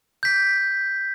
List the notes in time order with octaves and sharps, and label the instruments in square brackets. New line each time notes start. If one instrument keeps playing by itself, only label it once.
[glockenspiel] G6 B6